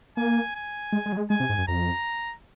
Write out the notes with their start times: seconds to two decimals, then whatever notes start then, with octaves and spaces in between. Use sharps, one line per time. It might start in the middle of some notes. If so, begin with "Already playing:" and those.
0.17 A#3 G#5
0.56 G#5
0.92 G#3
1.06 G#3
1.12 F#3
1.17 G#3
1.30 G#3 G#5
1.40 C3
1.49 G#2
1.58 F#2
1.68 F2 A#5